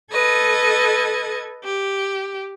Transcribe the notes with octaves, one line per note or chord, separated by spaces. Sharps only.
A4 B4 D#5 G#6
G4